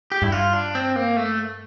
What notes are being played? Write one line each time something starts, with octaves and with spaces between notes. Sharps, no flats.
G4
G2 E4
F4
D4
C4
A#3
A3